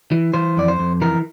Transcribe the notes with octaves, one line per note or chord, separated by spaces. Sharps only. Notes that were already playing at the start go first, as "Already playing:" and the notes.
E3
E3 C5
F2 D5
C5
F2
E3 A#4